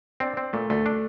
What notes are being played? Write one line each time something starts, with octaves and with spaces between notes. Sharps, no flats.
C4 D4
C4
A#2 A3
D2 A3
D4